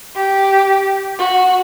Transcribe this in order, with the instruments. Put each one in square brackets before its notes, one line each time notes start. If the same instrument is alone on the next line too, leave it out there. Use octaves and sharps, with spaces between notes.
[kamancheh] G4
F#4